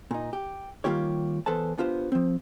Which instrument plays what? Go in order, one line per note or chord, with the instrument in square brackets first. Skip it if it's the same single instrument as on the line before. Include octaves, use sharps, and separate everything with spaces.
[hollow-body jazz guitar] A#2 D#4
G4
D#3 G3 A#3 F4 G4 C#5
E2 A4 B4 C5 A5
B3 D4 F4 G4 C5
F3 C4